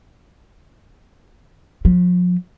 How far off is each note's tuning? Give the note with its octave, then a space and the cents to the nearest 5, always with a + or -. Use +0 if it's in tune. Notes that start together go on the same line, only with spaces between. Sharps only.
F3 +40